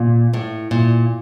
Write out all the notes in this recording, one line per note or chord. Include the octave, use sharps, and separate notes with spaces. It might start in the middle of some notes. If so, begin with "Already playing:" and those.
Already playing: A#2
A2
A#2